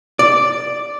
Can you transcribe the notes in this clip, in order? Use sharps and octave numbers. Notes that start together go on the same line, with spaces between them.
D5